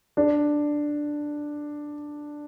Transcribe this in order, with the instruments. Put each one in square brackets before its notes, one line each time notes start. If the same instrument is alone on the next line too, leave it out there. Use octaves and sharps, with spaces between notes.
[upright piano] D4